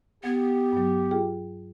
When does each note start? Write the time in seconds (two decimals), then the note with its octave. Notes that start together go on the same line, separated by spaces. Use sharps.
0.24 B3 G4 F#5 G#6
0.72 G2 F#3
1.11 F4 G#4 G5